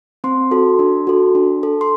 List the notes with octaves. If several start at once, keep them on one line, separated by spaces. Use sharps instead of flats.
C4 C6
F#4 A4
D4
F#4 A4
D4
A4
C6